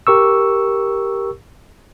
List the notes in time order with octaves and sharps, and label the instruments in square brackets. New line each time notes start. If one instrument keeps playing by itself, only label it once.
[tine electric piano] G4 A#4 C#6 E6